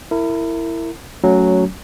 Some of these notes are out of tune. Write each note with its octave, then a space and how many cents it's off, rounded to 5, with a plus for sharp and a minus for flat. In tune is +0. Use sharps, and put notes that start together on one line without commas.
E4 +10 A#4 -30
F#3 +0 A3 +0 C#4 +15